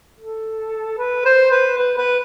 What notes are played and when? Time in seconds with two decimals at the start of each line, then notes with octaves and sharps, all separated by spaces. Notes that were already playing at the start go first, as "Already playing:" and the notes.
0.19 A4
0.98 B4
1.25 C5
1.51 B4
1.78 B4
1.97 B4